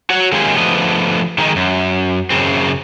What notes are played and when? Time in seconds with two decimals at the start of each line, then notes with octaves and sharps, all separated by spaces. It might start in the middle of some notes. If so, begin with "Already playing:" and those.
0.10 F#4 C#5 F#5
0.32 D#3 G#3 A#3 C#4 G4 G#4
0.57 D3 F3 A3 B3 B4 D#5
1.38 D#3 G#3 D#4
1.56 F#2
2.30 F#2 C#3 C4